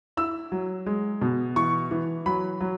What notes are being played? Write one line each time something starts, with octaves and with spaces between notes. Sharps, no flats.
E4 E6
F#3
G#3
B2
E3 C#6
E3
F#3 B5
F#3